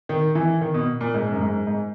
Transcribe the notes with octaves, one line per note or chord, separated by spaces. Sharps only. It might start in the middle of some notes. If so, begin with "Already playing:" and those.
D#3
E3
D#3
B2
A#2
G#2
F#2
G#2
G#2